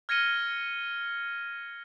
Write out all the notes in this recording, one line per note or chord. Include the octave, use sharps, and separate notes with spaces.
F6 G#6 A#6 C#7 D#7 G7